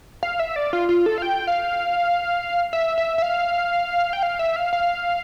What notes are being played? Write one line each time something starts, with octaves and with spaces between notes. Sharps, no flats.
F5
E5
D5
F4
F4
A4
F5
G5
F5
E5
E5
E5
F5
G5
F5
E5
F5
F5